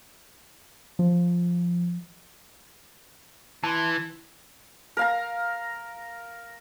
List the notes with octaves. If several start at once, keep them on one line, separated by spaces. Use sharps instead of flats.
F3
E3 A5 C6
A#4 F5 A#5